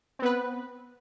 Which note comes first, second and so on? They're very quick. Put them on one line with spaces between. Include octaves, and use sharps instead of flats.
C4 B3 B4